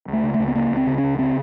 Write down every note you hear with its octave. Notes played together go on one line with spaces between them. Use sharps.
C#2
A3
C#3
C#2 A3
B3
C#3 A#3
C#2
C4
C#3
C#4
C#2
C#3 C4